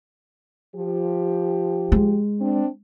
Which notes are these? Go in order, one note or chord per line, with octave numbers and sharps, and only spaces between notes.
F3 G4
G#3
C4 D4